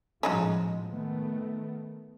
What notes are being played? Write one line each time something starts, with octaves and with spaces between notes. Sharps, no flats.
A2 F3 G#3 C#4 D#4 F#4
D#3 A3 B3